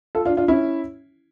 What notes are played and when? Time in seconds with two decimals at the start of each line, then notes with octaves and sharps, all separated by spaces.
0.15 F4 A4
0.25 D4 F4
0.37 D4 F4
0.48 C#4 E4